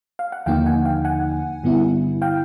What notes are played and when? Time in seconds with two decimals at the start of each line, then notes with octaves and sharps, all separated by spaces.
0.19 F5
0.32 F#5
0.46 D#2 D3 F3 A#3 D#4 F5 G5
0.66 F#5 G#5
0.85 F5 G5
1.05 F#5 G#5
1.63 G2 D3 G3 B3 E4
2.22 F5 G5